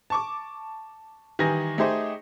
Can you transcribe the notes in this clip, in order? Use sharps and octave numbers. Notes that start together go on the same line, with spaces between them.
A5 C#6 D6
D#3 E3 G3 G#5 A#6
A3 D#4 G4 G#4 C5 D#5